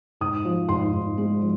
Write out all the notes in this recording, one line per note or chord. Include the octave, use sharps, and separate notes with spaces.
G#2 D#6
F3
G#2 C6
G#2
G#3
F3